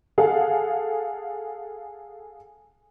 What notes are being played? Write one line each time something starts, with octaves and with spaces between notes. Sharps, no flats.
G#4 A4 F5 F#5